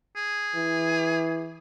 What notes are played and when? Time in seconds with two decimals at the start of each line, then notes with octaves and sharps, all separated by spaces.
0.16 G#4
0.56 E3